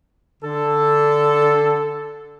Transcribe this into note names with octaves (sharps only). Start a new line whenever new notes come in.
D3 A4